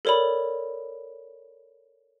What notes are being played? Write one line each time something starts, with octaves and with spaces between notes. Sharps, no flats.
A4 A#4 C#5 D5 B5